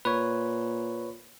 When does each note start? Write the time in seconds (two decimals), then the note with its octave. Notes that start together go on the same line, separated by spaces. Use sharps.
0.05 A#2 B4 C#5